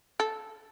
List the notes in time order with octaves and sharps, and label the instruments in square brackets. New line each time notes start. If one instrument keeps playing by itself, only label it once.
[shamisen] A4